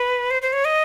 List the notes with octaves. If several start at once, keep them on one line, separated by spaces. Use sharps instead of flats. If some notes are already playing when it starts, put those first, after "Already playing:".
Already playing: B4
C5
C5
C#5
D#5